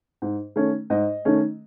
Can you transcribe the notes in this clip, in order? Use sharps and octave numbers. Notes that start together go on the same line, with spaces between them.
G#2
D#3 A3 C#4
G#2 D#5
D#3 A3 C#4